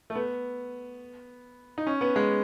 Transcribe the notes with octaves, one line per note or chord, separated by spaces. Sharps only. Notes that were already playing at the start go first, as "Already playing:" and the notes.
A3
B3
D#4
C#4
B3
G#3